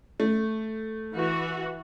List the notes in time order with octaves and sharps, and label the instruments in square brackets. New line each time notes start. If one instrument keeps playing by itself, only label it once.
[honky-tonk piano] A3
[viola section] E3 F#4